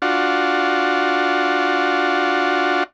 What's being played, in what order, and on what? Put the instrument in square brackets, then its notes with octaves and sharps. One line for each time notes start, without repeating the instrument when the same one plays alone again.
[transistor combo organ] D4 F4 F#4